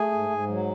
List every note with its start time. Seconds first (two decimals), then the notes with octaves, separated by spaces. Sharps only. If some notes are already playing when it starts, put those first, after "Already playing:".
Already playing: A3 G#4 G#5
0.12 G#2
0.30 G#2
0.48 F#3